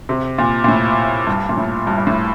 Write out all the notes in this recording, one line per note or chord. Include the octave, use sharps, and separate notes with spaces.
C3
A#2
A#2
A2
G2
A#2
A2
G2
G2
A2